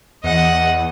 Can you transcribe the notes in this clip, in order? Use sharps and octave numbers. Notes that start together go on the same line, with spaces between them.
E2 D#5 F#5